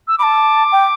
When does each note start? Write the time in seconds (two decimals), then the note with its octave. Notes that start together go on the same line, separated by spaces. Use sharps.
0.08 E6
0.18 B5 D6
0.23 A5
0.72 G5